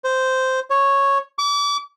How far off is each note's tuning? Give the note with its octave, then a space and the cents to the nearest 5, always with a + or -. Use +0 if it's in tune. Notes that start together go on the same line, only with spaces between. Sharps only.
C5 -10
C#5 -5
D6 -35